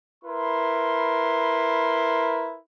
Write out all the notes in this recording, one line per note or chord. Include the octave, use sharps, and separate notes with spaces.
E4 A#4 B4 C6